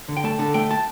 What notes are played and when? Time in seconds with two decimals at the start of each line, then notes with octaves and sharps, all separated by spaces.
0.09 D3
0.17 G5
0.24 A3 A5
0.39 D3 A5
0.54 A3 G5
0.71 A5